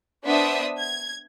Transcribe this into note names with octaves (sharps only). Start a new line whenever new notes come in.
B3 D4 C5 D5 E5 D#6
G#6